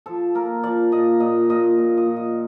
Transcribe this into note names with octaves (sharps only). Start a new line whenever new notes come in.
F3 A4
A#3 A#4
F3 D5
A#2 D#5
A#2 D#5
A#2 D#5
A#2
D#5
A#2
D#5